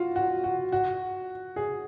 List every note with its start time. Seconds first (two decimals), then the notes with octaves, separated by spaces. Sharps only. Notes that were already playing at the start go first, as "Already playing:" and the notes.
Already playing: F4 F#4
0.16 F#4
0.44 F#4
0.72 F#4
1.56 G#4